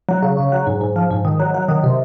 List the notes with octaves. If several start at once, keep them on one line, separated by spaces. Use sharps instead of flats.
F#3
C#3
C#3
F#3
G#2
G#2
F3
G#2
D#3
F#3
F#3
D#3
C3